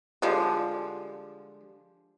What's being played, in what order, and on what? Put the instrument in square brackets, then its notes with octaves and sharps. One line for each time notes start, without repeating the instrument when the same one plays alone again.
[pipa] D3 F3 G3 G#3